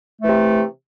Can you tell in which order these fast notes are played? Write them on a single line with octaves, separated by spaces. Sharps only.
A3 E3 C3